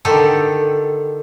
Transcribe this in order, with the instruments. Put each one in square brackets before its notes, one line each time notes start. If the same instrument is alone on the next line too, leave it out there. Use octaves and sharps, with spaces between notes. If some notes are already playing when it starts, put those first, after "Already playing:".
[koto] D3 D#3 G4 A4